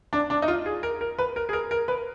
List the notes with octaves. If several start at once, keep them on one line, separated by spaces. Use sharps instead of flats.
D4
D4
D#4
F4
G#4
A#4
A#4
B4
A#4
G#4
A#4
A#4
B4